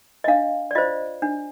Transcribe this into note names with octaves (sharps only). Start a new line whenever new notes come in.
D#5
D4 F5
D5
F4 C5 D#5
D4